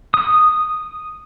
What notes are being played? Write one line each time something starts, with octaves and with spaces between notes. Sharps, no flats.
D#6